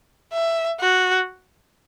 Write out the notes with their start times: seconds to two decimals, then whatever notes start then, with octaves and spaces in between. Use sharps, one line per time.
0.33 E5
0.80 F#4